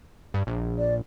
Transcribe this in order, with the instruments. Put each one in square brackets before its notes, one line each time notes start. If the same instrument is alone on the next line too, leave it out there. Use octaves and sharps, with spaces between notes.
[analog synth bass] G2
A#1
[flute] D5